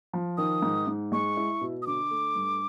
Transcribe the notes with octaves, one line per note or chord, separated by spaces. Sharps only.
F3
D#3 D#6
G#2
G#2
G#3 C#6
E4
B2
D#6
D3 D6
A3
G2